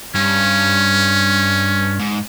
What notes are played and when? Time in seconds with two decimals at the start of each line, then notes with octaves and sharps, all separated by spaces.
0.15 G2 C#4
1.99 G#2